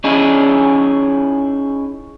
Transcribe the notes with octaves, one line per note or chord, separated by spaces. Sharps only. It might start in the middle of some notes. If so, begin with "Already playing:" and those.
C#4 D#4 E4 G#4 G#5